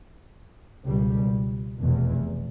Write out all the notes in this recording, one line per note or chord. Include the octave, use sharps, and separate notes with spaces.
C#2 B2 G3
F1 E2 B2